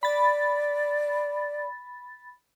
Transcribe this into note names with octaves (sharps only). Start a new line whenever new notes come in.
D5 B5 A6